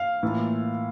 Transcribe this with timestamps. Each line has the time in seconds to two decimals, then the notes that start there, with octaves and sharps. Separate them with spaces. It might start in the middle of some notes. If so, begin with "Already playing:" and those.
Already playing: F5
0.23 A2 E3 A#3 F4